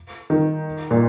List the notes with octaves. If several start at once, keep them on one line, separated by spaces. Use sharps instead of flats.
D#3
A#2